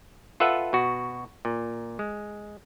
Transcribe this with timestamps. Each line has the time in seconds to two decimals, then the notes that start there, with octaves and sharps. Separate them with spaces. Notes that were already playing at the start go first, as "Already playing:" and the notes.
0.40 F4 A4 B4 E5 F#5
0.73 B2 F#4
1.45 A#2
1.99 G#3